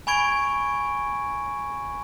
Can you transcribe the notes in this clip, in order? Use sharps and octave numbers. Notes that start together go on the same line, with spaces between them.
G#5 B5 C#6 G#6 D7